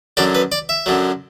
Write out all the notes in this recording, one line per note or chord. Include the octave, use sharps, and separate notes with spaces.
F#2 D3 F#3 D5
B4
D5
E5
F#2 D3 F#3